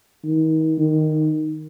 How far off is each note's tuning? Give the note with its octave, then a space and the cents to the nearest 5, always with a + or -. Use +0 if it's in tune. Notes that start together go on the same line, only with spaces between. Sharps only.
D#3 +35
D#3 -5